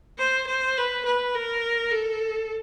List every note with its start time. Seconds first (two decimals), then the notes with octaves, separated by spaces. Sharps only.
0.18 C5
0.47 C5
0.77 B4
1.05 B4
1.34 A#4
1.91 A4